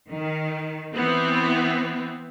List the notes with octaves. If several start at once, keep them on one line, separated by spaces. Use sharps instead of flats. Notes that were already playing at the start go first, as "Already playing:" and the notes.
D#3
E3 B3 C4